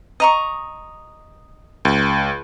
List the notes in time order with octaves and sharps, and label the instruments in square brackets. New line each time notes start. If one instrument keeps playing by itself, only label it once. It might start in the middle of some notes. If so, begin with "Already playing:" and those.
[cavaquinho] D#5 A#5 C#6
[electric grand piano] C#2